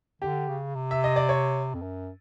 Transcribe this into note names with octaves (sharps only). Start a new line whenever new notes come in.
D3 G4
C#3
C3
E5
D#5
D5
C#5
F2
F#2